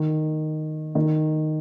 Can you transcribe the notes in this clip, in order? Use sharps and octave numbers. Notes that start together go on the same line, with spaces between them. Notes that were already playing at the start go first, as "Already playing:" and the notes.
Already playing: D#3
D#3